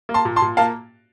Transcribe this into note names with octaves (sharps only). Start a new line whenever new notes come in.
A#3
A5 C6
A#2
A5 C6
A#2
A#3 F5 A5